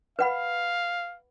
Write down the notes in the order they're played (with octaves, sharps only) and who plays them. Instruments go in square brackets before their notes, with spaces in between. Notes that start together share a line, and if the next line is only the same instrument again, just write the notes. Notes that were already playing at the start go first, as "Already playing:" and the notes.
[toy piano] B4 F#5 B5 [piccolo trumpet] F5